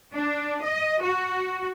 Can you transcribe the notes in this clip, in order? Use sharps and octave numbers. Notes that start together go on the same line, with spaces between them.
D4
D#5
F#4